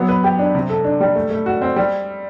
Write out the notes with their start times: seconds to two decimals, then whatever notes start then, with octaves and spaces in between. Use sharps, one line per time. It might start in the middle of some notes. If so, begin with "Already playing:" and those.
Already playing: F#3 B3
0.09 B4
0.24 G4
0.39 D4
0.55 C3
0.70 A4
0.85 D4
1.00 G3
1.15 A3
1.30 A3
1.46 F#4
1.62 C4
1.76 G3